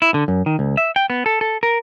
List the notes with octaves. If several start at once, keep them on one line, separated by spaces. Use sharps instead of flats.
E4
D3
F#2
D#3
C#2
E5
G5
B3
A4
A4
A#4